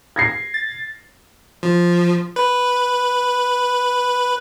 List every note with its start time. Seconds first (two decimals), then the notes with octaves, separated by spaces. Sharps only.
0.16 G#6 A#6 C7
0.54 A6
1.63 F3
2.36 B4